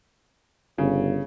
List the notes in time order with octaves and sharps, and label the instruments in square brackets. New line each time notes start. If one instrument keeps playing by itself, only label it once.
[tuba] G1 [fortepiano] C#3